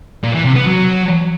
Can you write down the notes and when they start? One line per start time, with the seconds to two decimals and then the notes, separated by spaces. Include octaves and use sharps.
0.23 A#2
0.34 E3
0.45 C3
0.55 B3
0.66 F#3